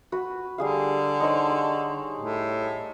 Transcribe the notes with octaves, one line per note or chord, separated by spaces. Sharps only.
F#4 B4
D3 G3 G#4 F5
D#4 C5 C#5
A2